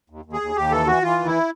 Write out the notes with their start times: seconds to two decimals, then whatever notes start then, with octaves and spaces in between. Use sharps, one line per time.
0.10 D#2
0.25 D#2
0.33 G#4
0.41 D#2
0.56 D#2 G4
0.71 E3 A4
0.87 E3 F#4
1.03 E3 F4
1.19 D#2
1.26 E4